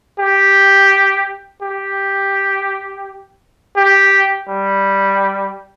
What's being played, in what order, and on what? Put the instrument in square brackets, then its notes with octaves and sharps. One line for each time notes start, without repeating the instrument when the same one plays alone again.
[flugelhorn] G4
G4
G4
G3